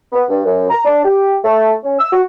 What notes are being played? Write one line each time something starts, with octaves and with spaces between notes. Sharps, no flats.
B3
G2
F#2
A#5
D4
G4
A3
C#4
E6
F#4